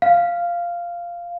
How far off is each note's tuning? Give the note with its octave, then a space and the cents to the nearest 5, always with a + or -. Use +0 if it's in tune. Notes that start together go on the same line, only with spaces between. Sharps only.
F5 -10